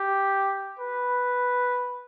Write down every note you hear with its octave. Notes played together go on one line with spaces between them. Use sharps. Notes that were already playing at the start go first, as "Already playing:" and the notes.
Already playing: G4
B4